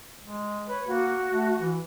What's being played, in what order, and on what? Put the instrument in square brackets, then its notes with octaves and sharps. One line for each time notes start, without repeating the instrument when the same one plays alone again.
[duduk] G#3
[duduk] B4 [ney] C#5
[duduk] A#3 [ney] F#4
[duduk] A3
E3